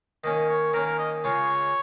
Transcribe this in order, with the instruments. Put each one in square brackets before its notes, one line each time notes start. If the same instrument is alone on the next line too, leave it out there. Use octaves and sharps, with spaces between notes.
[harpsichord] D#3 A#3 C#4 [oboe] D#5
[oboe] C#5
[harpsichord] D#3 A#3 C#4 [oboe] A#4
[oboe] A#4
D#5
[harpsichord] C#3 G#3 F4 [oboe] C#5